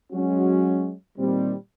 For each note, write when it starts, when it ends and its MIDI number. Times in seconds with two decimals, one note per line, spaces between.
0.12 0.92 54
0.12 0.92 56
0.12 0.92 61
0.12 0.92 66
1.18 1.54 46
1.18 1.54 51
1.18 1.54 55
1.18 1.54 60